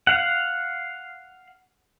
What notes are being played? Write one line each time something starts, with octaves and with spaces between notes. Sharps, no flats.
F5 F#5